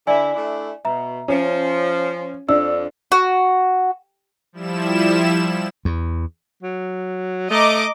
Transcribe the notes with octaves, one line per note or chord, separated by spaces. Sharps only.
D3 E4 D5 G#5
A3 D4 E4
B2 E5 A#5
F3 C#4
F2 D4 E6
F#4
F3 G3 E4 E7
E2
F#3
A3 D#5 A#5 D6